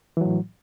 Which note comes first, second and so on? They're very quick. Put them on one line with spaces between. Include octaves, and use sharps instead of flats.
E3 F#3 A2